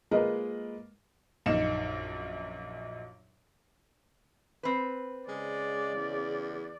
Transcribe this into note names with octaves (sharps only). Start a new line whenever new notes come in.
G#3 A#3 F4 A#4 B4 D#5
A#1 F#2 D#4 F5 C#7 E7
C4 B4
C#3 G#3 D5
E2